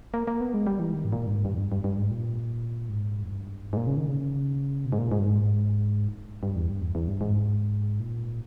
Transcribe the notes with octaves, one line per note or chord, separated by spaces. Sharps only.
A#3
A#3
B3
G#3
G3
E3
D#3
G#2
A#2
G2
G#2
G2
E2
G2
G2
G2
G#2
A#2
G#2
E2
G2
G#2
A#2
C#3
D#3
C#3
B2
G#2
A#2
G#2
G2
G#2
G2
E2
G2
E2
E2
G2
G#2
A#2